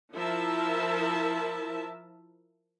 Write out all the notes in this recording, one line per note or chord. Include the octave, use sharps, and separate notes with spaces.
F3 E4 A#4 E5 A5